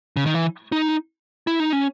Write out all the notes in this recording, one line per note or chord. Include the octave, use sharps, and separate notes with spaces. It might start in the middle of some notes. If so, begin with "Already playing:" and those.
C#3
D#3
E3
D#4
E4
D#4
C#4